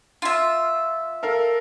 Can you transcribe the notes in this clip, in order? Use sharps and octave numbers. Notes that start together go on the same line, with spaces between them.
F4 E5
A4 A#4 F5